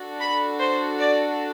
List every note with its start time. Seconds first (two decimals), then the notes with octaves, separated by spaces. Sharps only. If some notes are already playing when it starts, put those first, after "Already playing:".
Already playing: D4 F#4 A4
0.20 B5
0.59 C5
0.98 D5